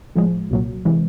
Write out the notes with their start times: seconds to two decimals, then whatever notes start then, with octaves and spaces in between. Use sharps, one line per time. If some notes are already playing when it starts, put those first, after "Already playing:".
0.15 A2 F3 G#3
0.50 C2 A#2 F#3
0.85 C3 E3 G#3